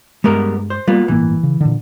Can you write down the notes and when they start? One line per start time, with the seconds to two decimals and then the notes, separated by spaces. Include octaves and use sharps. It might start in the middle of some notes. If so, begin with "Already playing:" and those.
0.24 G2 G3 G#3 B3 A#4
0.70 C5
0.88 G3 A#3 B3 F4
1.08 G1 A2 E3 A#3
1.43 C#3
1.61 A#2 D3